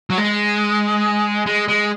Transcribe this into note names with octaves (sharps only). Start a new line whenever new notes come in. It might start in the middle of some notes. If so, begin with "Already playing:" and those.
F#3
G#3
G#3
G#3